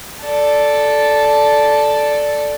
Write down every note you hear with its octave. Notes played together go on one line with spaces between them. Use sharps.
A4 D5